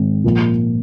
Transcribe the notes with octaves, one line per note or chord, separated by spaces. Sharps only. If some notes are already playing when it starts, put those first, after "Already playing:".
Already playing: G#2 D#3 G#3 C4
A#2 F3 A#3